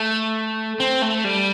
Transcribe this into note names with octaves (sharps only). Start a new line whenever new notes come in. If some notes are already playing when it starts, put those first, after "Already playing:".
Already playing: A3
C4
A3
G3